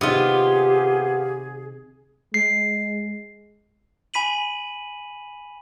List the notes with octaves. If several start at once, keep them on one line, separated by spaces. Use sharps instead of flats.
C3 D#3 B3 F4 G4 G#4
G#3 C7
G#5 B5 B6 D#7 F#7